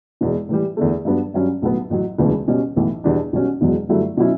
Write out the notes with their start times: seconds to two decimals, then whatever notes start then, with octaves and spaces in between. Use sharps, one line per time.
0.21 E1 E2 B2
0.49 A2 E3 G3
0.77 E2 D3 A3
1.05 G2 F#3 B3 D4
1.34 G2 F#3 C#4
1.62 B1 A2 F#3 B3
1.90 A1 A2 F#3
2.18 E1 D2 C#3 E3 B3
2.48 B2 G3 C#4
2.76 B1 A2 E3
3.04 E2 B2 G3 D4
3.33 B1 B2 G3 C#4 F#4
3.61 E1 E2 B2 F#3
3.89 G1 G2 F#3 A3 E4
4.17 B2 F#3 C#4 E4